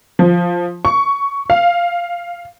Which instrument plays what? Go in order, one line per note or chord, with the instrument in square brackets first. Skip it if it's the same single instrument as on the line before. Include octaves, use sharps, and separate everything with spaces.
[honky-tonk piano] F3
C#6
F5